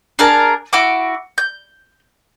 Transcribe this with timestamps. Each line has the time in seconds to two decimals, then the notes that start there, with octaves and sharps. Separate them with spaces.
0.19 D4 G#4 A#4 A5
0.73 E4 F#4 D6
1.38 G6